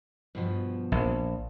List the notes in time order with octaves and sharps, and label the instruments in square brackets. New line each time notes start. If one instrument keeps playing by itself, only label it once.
[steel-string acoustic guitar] G2 B2 F3
[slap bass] A#1